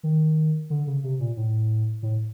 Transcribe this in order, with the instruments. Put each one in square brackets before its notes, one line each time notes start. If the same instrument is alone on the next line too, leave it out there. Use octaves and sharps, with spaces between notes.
[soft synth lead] D#3
D3
C#3
C3
A#2
A2
A2